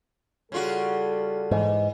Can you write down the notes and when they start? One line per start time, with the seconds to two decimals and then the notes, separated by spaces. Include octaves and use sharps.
0.52 C#3 G3 F4 F#4 A4
1.51 G#2 E3